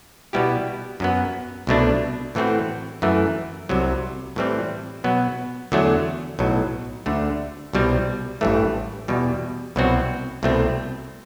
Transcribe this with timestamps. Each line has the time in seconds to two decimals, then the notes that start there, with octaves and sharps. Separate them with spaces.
0.33 B2 G3 B3 E4 G4
1.00 F#2 F#3 B3
1.67 C2 B2 A3 D4
2.35 A2 E3 A3 C4 F#4
3.02 F#2 E3 A3
3.69 C2 C3 F#3
4.36 A2 E3 G3 C4
5.04 B2 F#3 B3
5.72 E2 D3 F#3 A3
6.39 B1 A2 F#3
7.06 D2 D3 A3
7.73 C2 B2 G3 C4
8.41 A1 G2 E3 A3
9.08 E2 B2 G3
9.76 C2 B2 F#3 C4 F#4
10.43 C2 B2 A3 C4